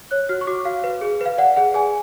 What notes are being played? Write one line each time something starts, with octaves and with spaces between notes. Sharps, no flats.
C#5 F#6
F#4 F6
C#6
F#4 D6
F#4 F5
B4
G#4
B4 F5
D5 F#5
G#4 F#5
G#4 G#5